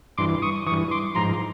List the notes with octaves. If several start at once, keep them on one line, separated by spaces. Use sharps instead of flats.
G2 E3 C6 D6
C#6 D#6
G2 E3 C#6 D#6
C6 D6
G#2 F3 A#5 C6